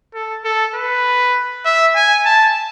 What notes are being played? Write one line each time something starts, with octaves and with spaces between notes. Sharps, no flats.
A4
A4
B4
E5
G#5
A5